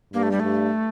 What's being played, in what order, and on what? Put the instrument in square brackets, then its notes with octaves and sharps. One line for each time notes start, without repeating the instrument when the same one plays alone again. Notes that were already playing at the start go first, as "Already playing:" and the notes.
[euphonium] G2 [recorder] A#3
[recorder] A3
G3
[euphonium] G2 [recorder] A3